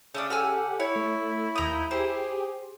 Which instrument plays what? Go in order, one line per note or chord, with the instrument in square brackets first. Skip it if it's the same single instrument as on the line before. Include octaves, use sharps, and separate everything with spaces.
[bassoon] C#3 [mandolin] A3 C#4 D4 [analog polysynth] D#6
[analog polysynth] G4 A4 F#5 [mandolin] G#5 E6 F6
[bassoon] E4 [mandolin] C#5
[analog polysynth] A3
[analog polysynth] D#2 G6 [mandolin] A#5 D#6
[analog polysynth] G4 G#4 [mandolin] C5